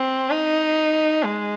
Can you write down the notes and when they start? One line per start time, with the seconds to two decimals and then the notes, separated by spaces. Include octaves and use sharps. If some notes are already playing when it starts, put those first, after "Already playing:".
Already playing: C4
0.31 D#4
1.23 G#3